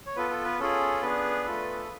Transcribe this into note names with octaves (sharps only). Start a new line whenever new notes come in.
C#5
B3 F4 A4 B4
A4
B4
C#4 F4 G#4 A4
B3 D4 G#4 B4
A3 F4 A4